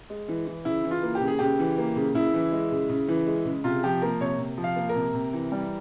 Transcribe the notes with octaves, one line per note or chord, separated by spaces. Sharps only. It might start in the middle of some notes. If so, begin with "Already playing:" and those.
G#3
E3
E3
C#3 E4
E3
F4
A#3
G4
C#3
G#4
C#3 G4
E3
A#3
C#3
C#3 E4
E3
G#3
C#3
C#3
E3
G#3
C#3
C3 F4
F3 G4
A#3 A#4
C3 C#5
C3
F3
F5
A#3
A#4
C3
C3
E3
G3